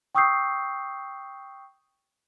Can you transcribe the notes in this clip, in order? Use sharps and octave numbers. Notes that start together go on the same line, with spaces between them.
G5 C#6 D#6 E6 G6 C7